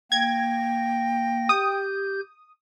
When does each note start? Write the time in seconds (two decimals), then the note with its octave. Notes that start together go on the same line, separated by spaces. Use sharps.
0.12 A#3 G5 G#6 A#6
1.49 G4 D#6 G6